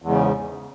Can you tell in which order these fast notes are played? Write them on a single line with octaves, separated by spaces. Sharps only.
E2 G#2 C#3